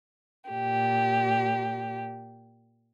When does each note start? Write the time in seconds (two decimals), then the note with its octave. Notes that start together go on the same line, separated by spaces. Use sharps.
0.50 A#2 G4